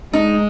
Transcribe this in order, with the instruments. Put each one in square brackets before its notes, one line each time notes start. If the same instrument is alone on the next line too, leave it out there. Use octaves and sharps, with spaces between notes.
[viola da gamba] G#3 [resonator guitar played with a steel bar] D#4